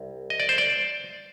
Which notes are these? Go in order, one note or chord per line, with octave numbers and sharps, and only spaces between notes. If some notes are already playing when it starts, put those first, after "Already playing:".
Already playing: C2
D#5
D5
C5
D5